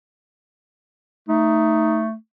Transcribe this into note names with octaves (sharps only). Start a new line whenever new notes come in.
A3 D#4